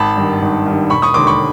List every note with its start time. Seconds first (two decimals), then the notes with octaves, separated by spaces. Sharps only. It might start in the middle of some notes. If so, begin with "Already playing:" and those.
Already playing: G#1 A5 B5
0.17 G2 D#3
0.42 G#1
0.66 G2 D#3
0.90 E1 B5 C#6
1.02 C#6 D#6
1.14 D#2 D3 C6 D6
1.27 B5 C#6